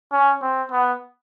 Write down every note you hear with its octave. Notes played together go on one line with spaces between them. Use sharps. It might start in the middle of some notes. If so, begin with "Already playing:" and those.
C#4
C4
B3